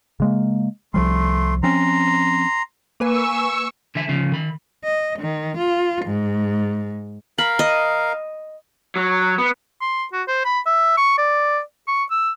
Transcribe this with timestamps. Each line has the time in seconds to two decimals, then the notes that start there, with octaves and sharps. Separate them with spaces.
0.20 C#3 G#3 A#3
0.94 C2 F3 G3 A3 C6
1.63 F3 C4 C#4 A#5 C6
3.00 A#3 B4 G#5 C#6 E6
3.95 D3 E3 E5
4.08 D2 C#3 F3
4.32 D#3 B5
4.84 D#5
5.19 D#3
5.58 F4
6.05 G#2
7.38 A#4 F5 B5
7.59 D#5
8.96 F#3
9.38 B3
9.81 C6
10.13 F#4
10.28 C5
10.45 B5
10.66 E5
10.97 C#6
11.18 D5
11.88 C#6
12.11 E6